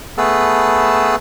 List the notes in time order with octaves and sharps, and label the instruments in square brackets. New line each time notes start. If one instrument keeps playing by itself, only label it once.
[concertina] A3 B3 G#4 B4 A5 E6